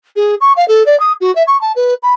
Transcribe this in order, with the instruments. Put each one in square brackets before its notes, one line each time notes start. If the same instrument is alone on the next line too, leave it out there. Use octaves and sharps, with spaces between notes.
[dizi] G#4
C#6
F5
A4
D5
D#6
F#4
E5
C#6
A5
B4
B5